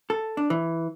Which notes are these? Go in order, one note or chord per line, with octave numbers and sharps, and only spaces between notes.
A4
D4
E3